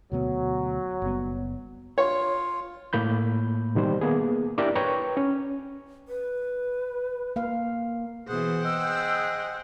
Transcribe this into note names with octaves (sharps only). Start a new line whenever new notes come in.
D2 B2 F#3 B3
F#1 G3 B3
F4 C#5
A2 A#3 B5 G6
B2 D#3 G3 C5
A#3 B3 G#4
D4 E4 G4 A#4 D5 E5
B4 C#5 G5 A#5 C#6
C#4
B4
A#3 F5
B2 E3 G#4 C5 F#5
G#4 D#5 G5 E6